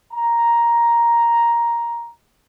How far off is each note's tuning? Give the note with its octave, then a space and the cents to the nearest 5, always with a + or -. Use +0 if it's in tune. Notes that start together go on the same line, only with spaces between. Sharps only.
A#5 +5